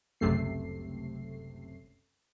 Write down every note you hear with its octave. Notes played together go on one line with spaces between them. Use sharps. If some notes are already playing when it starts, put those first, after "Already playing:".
G1 C#2 F#2 C3 A3 C7